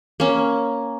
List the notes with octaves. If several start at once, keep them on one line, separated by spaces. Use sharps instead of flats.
A#3 C#4